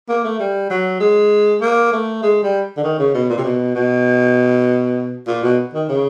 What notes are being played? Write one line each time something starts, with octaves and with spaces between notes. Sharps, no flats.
A#3
A3
G3
F#3
G#3
A#3
A3
G#3
G3
D3
D#3
C#3
B2
A#2
C3
B2
B2
A#2
B2
D#3
C#3